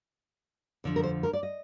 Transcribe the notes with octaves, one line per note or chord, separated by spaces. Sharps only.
F2 D3 F3
A#4
C5
A#4
D5
D#5